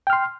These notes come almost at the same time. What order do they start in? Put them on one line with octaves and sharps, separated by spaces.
G5 F6 C6